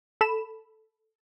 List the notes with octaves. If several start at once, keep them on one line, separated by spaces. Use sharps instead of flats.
A4 B5 E7